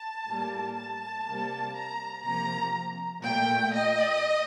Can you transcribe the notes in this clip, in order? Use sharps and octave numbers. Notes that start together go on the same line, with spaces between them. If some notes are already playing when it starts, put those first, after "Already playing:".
Already playing: A5
A2 G3 A#3
A5
C3 G3 A#3
A#5
C3 F3 A#3 A#5
A#2 A3 G5
D#5